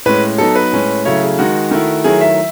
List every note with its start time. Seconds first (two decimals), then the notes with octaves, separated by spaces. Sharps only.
0.06 A2 G#3 C#4 B4
0.38 F#3 B3 D#4 A4
0.56 B4
0.72 A2 G#3 C#4
1.05 C#3 F#3 A3 E4 C#5
1.22 G#4
1.39 D#3 G#3 D#4 F#4
1.71 D#3 A3 E4
2.04 D#3 F#3 A3 E4 G#4
2.21 E5